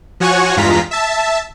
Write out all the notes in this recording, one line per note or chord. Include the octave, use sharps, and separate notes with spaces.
F3 F#4 C#5 F#5 G#5 C#6
E2 G2 G#3 F4 A#5 B6
E5 A5